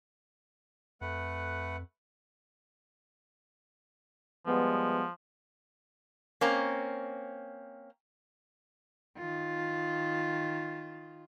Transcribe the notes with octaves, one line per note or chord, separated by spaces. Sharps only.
F2 A3 B4 F#5
F3 G3 G#3 B3
A#3 C4 C#4 A#5
D#3 F4